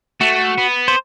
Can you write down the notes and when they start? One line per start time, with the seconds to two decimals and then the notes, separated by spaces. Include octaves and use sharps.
0.21 A3 F#4
0.58 B3
0.88 C5